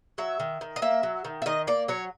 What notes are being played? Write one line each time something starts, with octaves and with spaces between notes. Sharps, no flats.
F#3 E5
D#3
D#3
D#5
A#3 E5
F#3
D#3
E5
D#3 D#5
A#3 D5
F#3 C#5